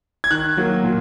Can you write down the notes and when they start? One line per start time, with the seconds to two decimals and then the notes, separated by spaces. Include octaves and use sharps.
0.24 G#6
0.31 D#3 F#6
0.57 F#3 A#3
0.83 A#2